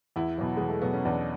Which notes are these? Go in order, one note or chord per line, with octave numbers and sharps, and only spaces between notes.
E2 E4
B2 F#3
E2 G#3
A3
B2 F#3 B3
C#4
E2 D4